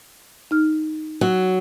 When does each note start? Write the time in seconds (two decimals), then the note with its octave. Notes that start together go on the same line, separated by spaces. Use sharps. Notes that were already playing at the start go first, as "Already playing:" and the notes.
0.51 D#4 F6
1.21 F#3